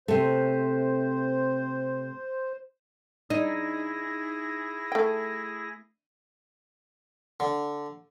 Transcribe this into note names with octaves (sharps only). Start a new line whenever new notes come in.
C3 A3 C5
D#4 E4 G#4 A#6
A3 G5
D3